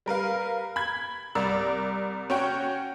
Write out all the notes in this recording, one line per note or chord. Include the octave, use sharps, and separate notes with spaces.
G3 A#4 B4 F5
B5 G#6
C2 A#4 D5 E6
C#4 F#4 C#5 F#5 G5